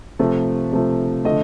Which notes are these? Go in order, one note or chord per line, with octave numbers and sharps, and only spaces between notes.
C3 F3 A3
C3 F3 A3
D3 F3 A3 D#5